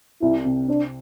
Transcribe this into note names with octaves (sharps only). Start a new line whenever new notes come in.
C2 E4
C3
C4 D4